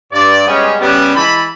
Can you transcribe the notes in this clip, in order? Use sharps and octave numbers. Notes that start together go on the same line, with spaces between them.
G2 D5
G3 G#3 B3 C#4
C#3 G3 B3
E3 G#3 A5 B5